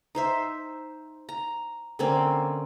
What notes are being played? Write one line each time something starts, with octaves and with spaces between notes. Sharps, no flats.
D#4 C5 E5
A#5
D3 A#3 C4 C#4